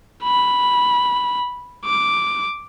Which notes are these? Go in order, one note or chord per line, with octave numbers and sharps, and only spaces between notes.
B5
D6